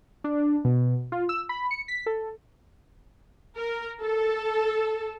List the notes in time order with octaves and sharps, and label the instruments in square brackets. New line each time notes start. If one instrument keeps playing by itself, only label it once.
[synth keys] D4
B2
F4
E6
B5
C#7
B6
A4
[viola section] A#4
A4